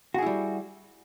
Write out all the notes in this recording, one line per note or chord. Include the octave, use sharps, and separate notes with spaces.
G3 E4 F#4 G#4